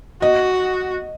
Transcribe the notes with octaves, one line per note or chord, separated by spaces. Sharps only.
F#4 D#5